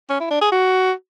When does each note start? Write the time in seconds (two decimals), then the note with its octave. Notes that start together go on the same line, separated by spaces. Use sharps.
0.10 C#4
0.20 E4
0.31 D4
0.41 G#4
0.52 F#4